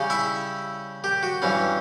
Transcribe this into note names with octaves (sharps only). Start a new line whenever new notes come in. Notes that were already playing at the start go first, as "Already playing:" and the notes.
Already playing: C#3 G3 C#4
E4 E5
G4
F#4
G2 E3 G3 C#4